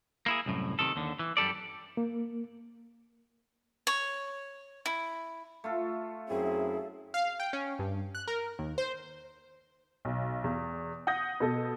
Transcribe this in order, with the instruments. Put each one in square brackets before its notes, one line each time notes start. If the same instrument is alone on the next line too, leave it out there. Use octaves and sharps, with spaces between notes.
[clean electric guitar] A#3 E4 G#4
C2 F#2 A2
C3 D#3 A4
D#2 D3
E3
F#2 G3 A4 D5
[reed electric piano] A#3
[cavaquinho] C#5
E4
[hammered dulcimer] A3 F4 A4
[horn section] F#2 C4 E4 [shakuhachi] G#4
[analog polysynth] F5
G5
C#4
G2
F#6
A#4
D#2
C5
[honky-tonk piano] B1
E2
F#5 D#6 G6 A#6
B2 A4